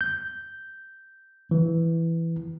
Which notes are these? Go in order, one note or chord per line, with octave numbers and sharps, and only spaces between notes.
G6
E3